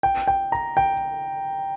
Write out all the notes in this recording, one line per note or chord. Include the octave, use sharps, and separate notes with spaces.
G5
G5
A#5
G5